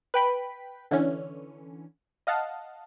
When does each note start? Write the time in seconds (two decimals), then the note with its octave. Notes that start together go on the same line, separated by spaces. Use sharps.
0.14 B4 G5 B5
0.91 D3 E3 C#4
2.27 D#5 F5 F#5 A5